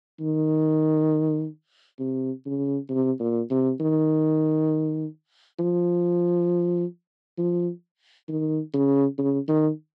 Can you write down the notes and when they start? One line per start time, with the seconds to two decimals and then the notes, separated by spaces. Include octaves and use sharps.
0.20 D#3
2.00 C3
2.46 C#3
2.90 C3
3.20 A#2
3.50 C3
3.80 D#3
5.59 F3
7.38 F3
8.28 D#3
8.74 C#3
9.18 C#3
9.48 D#3